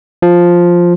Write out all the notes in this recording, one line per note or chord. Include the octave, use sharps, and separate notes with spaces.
F3